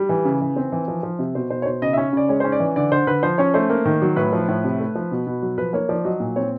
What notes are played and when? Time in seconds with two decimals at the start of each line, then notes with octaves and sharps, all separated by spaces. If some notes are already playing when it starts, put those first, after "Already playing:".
Already playing: G3
0.09 E3
0.25 C#3
0.41 E3
0.56 C4
0.72 E3
0.88 F3
1.03 F3
1.19 C3
1.35 B2 C5
1.50 B2 C5
1.62 C#5
1.66 B2 C5
1.82 C#3 D#5
1.93 C#4 E5
2.13 C#3 D5
2.29 G#3 C#5
2.40 C#4 C5
2.52 D5
2.60 E3
2.76 D3 D5
2.92 D3 C5
3.07 D3 B4
3.23 F3 C5
3.38 C#4 C#5
3.54 A3 C5
3.70 A#3
3.85 D#3
4.02 F#3
4.16 A2 B4
4.33 F3
4.48 A2
4.64 C3
4.80 A3
4.95 F3
5.11 B2
5.27 B2
5.42 F#3
5.58 F3 B4
5.73 A#3 C#5
5.89 F3 D5
6.04 F#3 D#5
6.20 A#2
6.36 C4 C#5